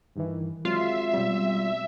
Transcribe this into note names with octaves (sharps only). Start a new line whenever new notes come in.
G2 D#3 E3
F#3 G#3 C4 F4 E5 C7
B2 G3 C4